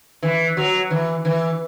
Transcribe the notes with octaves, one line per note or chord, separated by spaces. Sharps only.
E3
F#3
E3
E3